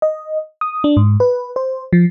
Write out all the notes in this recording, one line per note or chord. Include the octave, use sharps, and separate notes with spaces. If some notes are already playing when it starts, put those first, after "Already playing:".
D#5
D#6
D4
G#2
B4
C5
F3